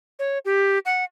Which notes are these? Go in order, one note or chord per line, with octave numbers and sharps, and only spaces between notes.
C#5
G4
F#5